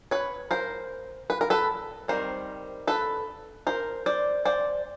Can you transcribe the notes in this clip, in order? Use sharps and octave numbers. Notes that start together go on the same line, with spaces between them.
B4 C#5
A#4 C5
B4
A#4
A4 B4
D#3 G3 C4 A#4 C5
A4 B4
A#4 C5
C5 D5
C5 D5